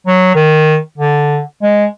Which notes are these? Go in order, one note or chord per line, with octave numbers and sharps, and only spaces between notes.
F#3
D#3
D3
G#3